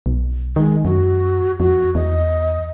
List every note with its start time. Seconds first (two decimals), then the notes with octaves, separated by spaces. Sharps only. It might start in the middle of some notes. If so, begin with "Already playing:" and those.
0.06 B1
0.56 D#3 G#3
0.85 F#2 F#4
1.60 F2 F#4
1.95 E2 D#5